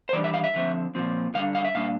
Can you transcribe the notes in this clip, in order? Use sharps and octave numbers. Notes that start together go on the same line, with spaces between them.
C5
E3 G3 D4 D5
E5
F5
E5
D3 F3 C4
A#2 F3 C4
D3 G3 D4 F5
F5
E5
A#2 G3 D4 F5